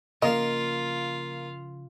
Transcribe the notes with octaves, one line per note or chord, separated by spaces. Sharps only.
C#3 F3 A#3 F4 D#5